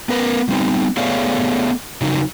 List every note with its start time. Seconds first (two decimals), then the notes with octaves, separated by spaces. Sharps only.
0.09 B3 A#4 B4
0.49 G3 B3 C4 D#4
0.97 A3 B3 G#4 C#5 D5 F5
2.01 C#3 F#3 D#4